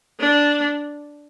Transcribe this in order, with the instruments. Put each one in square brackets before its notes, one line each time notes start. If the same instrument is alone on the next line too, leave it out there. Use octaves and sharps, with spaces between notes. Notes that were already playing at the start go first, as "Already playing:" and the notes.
[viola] D4